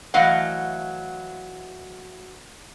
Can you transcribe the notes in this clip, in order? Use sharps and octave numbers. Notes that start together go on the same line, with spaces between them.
E3 F#3 A3 D#5 F5 F#5